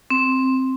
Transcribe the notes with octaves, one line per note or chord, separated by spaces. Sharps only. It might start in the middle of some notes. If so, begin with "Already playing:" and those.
C4